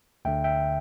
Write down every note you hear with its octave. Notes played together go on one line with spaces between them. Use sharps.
D2 D3 E5 G5
E5 G5